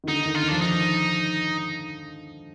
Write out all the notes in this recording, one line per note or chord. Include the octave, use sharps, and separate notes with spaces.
D#3
D3 D#4
D#3
F4
D#3
F3 D4
D#3 D#4